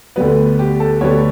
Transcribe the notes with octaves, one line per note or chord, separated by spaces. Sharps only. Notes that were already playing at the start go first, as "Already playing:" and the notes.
D2 D3 G3 B3 B4
G4
A4
D2 D3 G3 B3 C#5